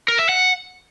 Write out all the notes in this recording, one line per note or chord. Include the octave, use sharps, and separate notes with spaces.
A#4
E5
F#5